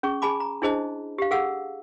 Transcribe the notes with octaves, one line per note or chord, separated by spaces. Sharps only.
C#4 G#4 C#6
G#4 G#5 A5 B5 D6
A#5
D4 E4 G#4 C5 D#5 A5
G4 F5
G#4 A4 F5 F#5 E6